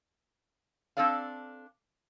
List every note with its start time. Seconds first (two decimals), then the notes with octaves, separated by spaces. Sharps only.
0.97 C4 D4 A4 D5 F5